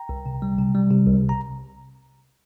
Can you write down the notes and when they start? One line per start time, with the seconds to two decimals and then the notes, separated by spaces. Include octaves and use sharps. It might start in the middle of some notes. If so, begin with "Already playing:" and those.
Already playing: G5 A#5
0.09 C2
0.26 C3
0.42 G3
0.58 C3
0.75 G3
0.91 C3
1.07 C2
1.29 A#5